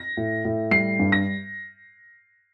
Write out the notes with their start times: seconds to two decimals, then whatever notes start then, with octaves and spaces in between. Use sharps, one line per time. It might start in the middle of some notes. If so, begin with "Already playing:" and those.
Already playing: A#6
0.17 A2
0.45 A2
0.71 G3 C7
0.99 G2
1.12 A#6